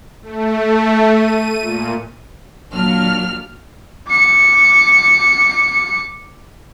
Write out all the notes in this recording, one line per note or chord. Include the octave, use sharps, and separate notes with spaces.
A3
D#7
A#2
D#2 A#2 F#3 D4 F6
D6 C#7